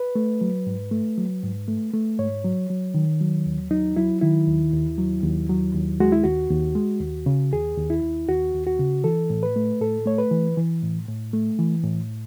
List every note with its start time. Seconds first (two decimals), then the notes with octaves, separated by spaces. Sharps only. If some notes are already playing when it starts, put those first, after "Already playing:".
Already playing: B4
0.15 A3
0.41 F#3
0.67 G#2
0.91 A3
1.17 F#3
1.43 G#2
1.68 A3
1.93 A3
2.18 G#2 C#5
2.45 F#3
2.70 F#3
2.94 D#3
3.21 F#3
3.46 D#2
3.71 F#3 D#4
3.96 F#3 E4
4.21 D#3 E4
4.47 D#2
4.73 D#2
4.98 F#3
5.23 D#2
5.50 F#3
5.75 D#2
6.00 G#3 F#4
6.12 E4
6.24 D#2 F#4
6.50 D#2
6.75 G#3
7.01 D#2
7.26 C#3
7.53 D#2 G#4
7.77 D#2
7.90 E4
8.03 D#2
8.28 D#2 F#4
8.54 D#2
8.67 F#4
8.79 C#3
9.04 E3 A4
9.30 A2
9.43 B4
9.56 A3
9.81 A2 A4
10.06 A3 C#5
10.18 B4
10.31 E3
10.57 E3
10.82 A2
11.08 A2
11.33 A3
11.59 E3
11.84 A2